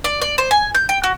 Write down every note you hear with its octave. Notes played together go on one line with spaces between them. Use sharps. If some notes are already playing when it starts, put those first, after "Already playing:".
D5
D5
C5
G#5
G6
G5
F#4